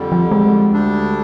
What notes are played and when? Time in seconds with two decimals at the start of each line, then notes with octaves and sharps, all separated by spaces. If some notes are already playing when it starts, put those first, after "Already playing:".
Already playing: F2 D3 G3
0.12 F3
0.32 G#3
0.71 D2 D3 G3 D4